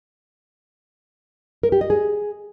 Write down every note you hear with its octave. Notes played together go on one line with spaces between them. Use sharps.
A#4
G4
D#5
G#4